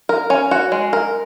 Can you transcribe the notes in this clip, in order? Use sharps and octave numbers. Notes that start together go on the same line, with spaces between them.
A#4
C#4
F#4
G#3
A#4